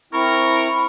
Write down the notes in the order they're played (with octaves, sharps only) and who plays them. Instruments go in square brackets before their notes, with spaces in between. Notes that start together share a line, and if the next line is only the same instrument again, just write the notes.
[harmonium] C4 E4 [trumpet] A#4 [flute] B5 [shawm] C#6